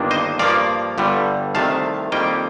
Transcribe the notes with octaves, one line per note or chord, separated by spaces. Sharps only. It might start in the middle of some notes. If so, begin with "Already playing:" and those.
Already playing: G1 G2 D#3 A#3 D4
C5 D#5
G2 F3 A#3 D5 F5
G1 G2 D3 G3
C2 C3 D#3 A3 F5 A5
F2 D#3 G3 A#3 D#5 G5